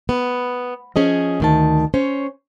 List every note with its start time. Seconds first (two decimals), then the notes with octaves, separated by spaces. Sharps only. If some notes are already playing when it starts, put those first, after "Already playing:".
0.09 B3
0.96 F3 C#4 G#4 D#5
1.40 D2 D#3 A5
1.94 C#4 C5 C#5